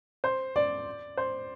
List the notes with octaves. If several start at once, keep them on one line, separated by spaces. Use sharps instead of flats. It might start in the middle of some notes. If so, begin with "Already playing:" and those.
C5
D5
C5